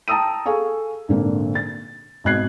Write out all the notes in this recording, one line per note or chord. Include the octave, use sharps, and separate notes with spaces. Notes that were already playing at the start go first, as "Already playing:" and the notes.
G5 A5 A#5 D#6 E6 D#7
G#4 A4 F5 G#5 C#6
G#1 A#2 D3 A#3
A6
G#1 B2 D#5 F#6 G#6 C7